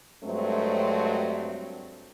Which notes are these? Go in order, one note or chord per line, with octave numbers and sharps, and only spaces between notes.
G2 F#3 G#3 A3 C4